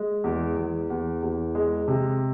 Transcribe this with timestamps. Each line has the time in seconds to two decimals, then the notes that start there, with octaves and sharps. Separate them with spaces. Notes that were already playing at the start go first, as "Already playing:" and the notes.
Already playing: G#3
0.24 E2
0.56 E2
0.90 E2
1.23 E2
1.55 G#3
1.88 C3